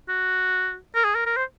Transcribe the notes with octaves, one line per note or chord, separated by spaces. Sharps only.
F#4
A#4
G#4
A#4
A#4
C5